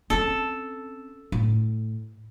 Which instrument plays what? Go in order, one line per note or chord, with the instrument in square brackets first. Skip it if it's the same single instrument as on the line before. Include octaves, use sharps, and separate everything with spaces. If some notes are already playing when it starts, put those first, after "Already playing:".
[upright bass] C4 C#4 [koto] A4
[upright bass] A2